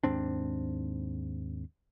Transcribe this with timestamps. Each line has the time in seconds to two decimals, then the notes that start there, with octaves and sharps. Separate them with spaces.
0.03 D#2 G#2 C4 D4